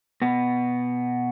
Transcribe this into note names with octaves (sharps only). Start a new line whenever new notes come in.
B2 B3